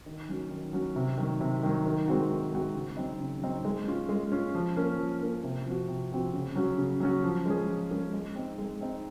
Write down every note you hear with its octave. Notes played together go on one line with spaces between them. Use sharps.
D#3
F#3 C#4 F#4
D#3
F#3 C#4 F#4
C3
D#3 F#3
C3
D#3 F#3
D#3
G#3 C4 F#4
D#3
G#3 C4 F#4
C#3
F#3 C4 D#4
C#3
F#3 C4 D#4
G#3
C#4 F4
G#3
C#4 F4
F3
A#3 C#4
F3
A#3 C#4
C3
F3 C4 F#4
C3
F3 C4 F#4
C#3
F#3 C#4 F#4
C#3
F#3 C#4 F#4
F3
G#3 C#4 G#4
F3
G#3 C#4 G#4
G#3
C4 D#4
G#3
C4 D#4